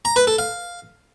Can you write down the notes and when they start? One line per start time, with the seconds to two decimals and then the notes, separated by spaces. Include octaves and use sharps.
0.05 A#5
0.16 B4
0.27 A4
0.39 F5